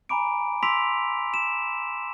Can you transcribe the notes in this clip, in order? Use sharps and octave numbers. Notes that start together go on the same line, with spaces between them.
G#5 A#5 B5 D6 D7
C6 D6 E6 B6 D7 F7
E7